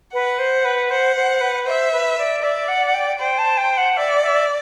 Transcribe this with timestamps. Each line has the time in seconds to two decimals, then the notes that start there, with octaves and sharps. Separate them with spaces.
0.13 B4 F#5
0.39 C5
0.65 B4
0.90 C5 F#5
1.16 C5
1.41 B4
1.66 C5 E5
1.92 B4
2.18 D5
2.43 D5 E5
2.68 F#5
2.86 F#5
2.94 G5
3.20 C5 G5
3.38 A5
3.57 G5
3.77 F#5
3.96 D5 E5
4.22 E5